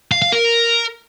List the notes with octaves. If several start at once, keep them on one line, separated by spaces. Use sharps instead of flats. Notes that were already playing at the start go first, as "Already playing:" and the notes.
F5
F5
A#4